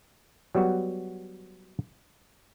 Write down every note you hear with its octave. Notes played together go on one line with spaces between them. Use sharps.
F#3 G3 B3 F#4